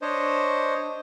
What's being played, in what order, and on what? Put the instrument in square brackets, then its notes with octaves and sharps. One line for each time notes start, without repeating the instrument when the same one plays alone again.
[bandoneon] D4 C5 C#5 D#5